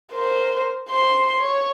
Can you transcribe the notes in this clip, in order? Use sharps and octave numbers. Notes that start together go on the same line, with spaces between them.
A#4 C5
C5 C6
C#5